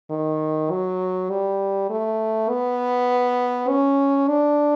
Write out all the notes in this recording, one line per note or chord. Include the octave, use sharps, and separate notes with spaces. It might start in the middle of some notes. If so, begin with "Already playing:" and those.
D#3
F#3
G3
A3
B3
C#4
D4